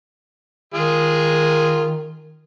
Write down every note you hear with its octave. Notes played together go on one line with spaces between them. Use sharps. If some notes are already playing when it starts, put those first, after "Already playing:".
D#3 G#3 F4 G#4